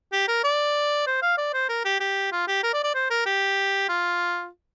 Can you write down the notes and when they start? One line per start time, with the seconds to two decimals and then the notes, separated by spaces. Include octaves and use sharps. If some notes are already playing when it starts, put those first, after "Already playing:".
0.12 G4
0.28 A#4
0.44 D5
1.07 C5
1.22 F5
1.38 D5
1.53 C5
1.69 A#4
1.85 G4
2.00 G4
2.32 F4
2.48 G4
2.63 A#4
2.74 D5
2.84 D5
2.94 C5
3.10 A#4
3.26 G4
3.89 F4